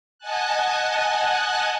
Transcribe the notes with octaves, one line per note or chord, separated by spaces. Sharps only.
D#5 F#5 G#5 A5 F#6